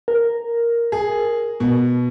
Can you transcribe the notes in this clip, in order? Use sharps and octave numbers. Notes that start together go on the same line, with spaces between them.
A#4
G#4
B2